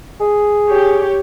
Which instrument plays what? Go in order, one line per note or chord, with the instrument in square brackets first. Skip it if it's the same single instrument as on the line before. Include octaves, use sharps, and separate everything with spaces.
[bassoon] G#4
[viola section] G4 C#5